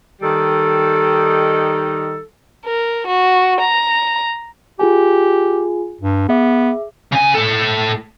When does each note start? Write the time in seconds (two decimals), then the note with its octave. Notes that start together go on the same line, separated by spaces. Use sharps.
0.21 D#3 G3 D#4 A4
2.66 A#4
3.07 F#4
3.61 A#5
4.79 F4 G4 G#4 G#5
6.01 G2
6.29 B3 G#4 E5 D6
7.12 C#3 G#5
7.35 A2 A4